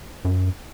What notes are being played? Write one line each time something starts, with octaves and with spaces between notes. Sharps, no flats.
F#2